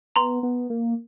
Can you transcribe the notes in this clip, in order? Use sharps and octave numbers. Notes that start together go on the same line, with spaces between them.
B3 A#5 C6
B3
A#3